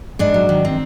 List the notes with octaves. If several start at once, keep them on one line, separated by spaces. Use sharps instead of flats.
G#2 D4
F#3
D#3
C4